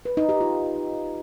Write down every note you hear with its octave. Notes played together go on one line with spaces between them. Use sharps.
B4
D#4
G4
F4